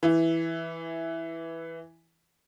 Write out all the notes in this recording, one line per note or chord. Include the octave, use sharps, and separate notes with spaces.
E3 E4